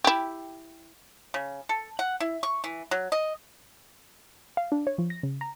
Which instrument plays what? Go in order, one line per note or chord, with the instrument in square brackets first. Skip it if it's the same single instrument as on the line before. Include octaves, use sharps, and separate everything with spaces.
[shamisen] E4 G4
[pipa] C#3
A4
F#5
E4
C#6
E3
F#3
D#5
[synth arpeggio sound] F5
D4
C#5
F3
A#6
C#3
A#5